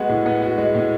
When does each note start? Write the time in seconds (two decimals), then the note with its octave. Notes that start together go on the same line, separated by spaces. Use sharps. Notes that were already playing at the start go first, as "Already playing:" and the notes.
Already playing: G#3 B3 F#4
0.09 A2
0.26 B3
0.42 F#4
0.58 G#3
0.75 A2